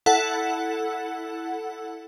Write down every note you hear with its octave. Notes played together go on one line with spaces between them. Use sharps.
E4 A4 F#5